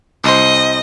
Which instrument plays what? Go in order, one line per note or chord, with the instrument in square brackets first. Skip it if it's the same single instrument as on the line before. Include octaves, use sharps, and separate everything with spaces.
[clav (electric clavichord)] C2 C5 [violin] D#5